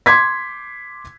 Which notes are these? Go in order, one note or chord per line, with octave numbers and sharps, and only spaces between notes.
C6 D6 G#6 B6